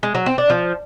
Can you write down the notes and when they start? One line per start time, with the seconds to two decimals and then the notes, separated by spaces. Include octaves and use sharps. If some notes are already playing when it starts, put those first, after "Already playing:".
0.03 G#3
0.15 F#3
0.26 C4
0.38 D4
0.50 F3